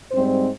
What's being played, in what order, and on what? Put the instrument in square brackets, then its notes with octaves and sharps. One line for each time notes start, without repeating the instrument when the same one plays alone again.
[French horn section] G#2 G3 C4 C5